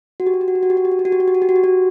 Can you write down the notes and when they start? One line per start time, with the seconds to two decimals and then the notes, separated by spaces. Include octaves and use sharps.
0.20 F#4
0.27 G4
0.34 F#4
0.41 G4
0.48 F#4
0.55 G4
0.63 F#4
0.70 G4
0.77 F#4
0.85 G4
0.91 F#4
0.99 G4
1.05 F#4
1.12 G4
1.20 F#4
1.28 G4
1.35 F#4
1.42 G4
1.49 F#4
1.56 G4
1.64 F#4